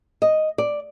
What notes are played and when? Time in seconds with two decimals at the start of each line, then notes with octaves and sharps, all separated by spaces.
0.22 D#5
0.58 D5